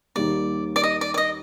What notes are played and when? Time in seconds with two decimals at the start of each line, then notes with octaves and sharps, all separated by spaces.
0.15 D#2 D#3 G3 A#3 D5
0.76 D5
0.83 D#5
1.01 D5
1.14 D5
1.18 D#5